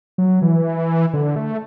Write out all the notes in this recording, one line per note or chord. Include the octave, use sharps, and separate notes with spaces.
F#3
E3
D3
A3